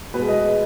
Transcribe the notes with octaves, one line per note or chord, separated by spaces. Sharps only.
B2 G#3 B4
D#5